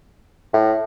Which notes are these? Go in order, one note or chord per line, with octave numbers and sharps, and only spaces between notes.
A2